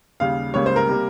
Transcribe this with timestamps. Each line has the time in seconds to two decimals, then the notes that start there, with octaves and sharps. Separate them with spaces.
0.20 D#2 C#3 G3 F5
0.54 C#2 C#3 G3 A#3 C#5
0.66 C5
0.76 A#4
0.88 C3 G3 A#3